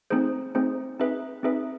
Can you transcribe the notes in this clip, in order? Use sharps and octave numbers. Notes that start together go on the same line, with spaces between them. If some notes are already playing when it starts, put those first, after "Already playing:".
A3 C4 D#4 G#4 C5
A3 C4 D#4 G#4 C5
C4 D#4 G#4 B4 E5
C4 D#4 G#4 B4 E5